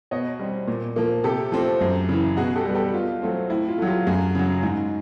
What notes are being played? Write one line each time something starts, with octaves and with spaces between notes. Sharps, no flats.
B2 C#5 D#5
G3 C4
A#2
F3 A#3
C3 G4 A4
F3 A3 C4
F#2
C#3 E3
B2 F#4 G#4
G4 A4
G3 B3
G4 A4
B2 F4
F#3 A3 C4
A2 E4
F4
F#3 A3
F4 G4
F#2 F#4 G#4
C#3 F#3
G#2